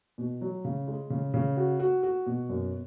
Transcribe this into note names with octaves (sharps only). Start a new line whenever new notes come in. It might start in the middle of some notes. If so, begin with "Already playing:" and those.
B2
F#3
C#3
G#3
C#3
C#3
F#4
F#4
F#4
B2
F#2